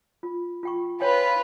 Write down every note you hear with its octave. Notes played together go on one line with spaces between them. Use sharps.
F4
F4 G5 C#6
F4 B4 C#5 G5 G#5